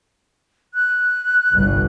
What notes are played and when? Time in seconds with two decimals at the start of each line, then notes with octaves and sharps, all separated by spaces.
0.74 F#6
1.52 G1 C2 G2